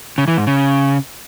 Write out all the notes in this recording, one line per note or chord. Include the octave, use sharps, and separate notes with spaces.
C#3
E3
G#2
C#3